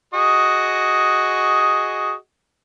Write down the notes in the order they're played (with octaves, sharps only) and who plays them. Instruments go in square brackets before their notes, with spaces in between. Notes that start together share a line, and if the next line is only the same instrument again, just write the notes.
[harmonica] F#4 G#4 D#5